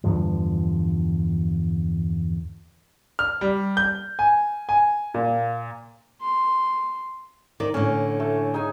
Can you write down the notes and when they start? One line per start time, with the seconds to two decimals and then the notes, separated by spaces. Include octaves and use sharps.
0.04 E2 G2 D3 F3
3.19 F6
3.41 G3
3.77 G6
4.19 G#5
4.69 G#5
5.14 A#2
6.22 C6
7.60 D#3 D5
7.74 A2 D3 C#4
8.20 A3
8.54 D#4 G#4 G#5